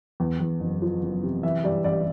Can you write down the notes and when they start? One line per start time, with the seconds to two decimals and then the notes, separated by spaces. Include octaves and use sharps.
0.20 E2
0.40 E2
0.60 F#1
0.82 F3
1.02 F#1
1.23 C3
1.43 E3 E5
1.64 G2 D5
1.84 A1 D5